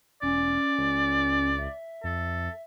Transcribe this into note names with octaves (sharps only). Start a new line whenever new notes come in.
E1 C#4 D5
C#2
E5
F2 A4